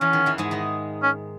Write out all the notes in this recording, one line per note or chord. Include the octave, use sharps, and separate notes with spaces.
E2 E3 C#4
D#3
E2 E3
G#2 G#3
D#3 D#4
C#4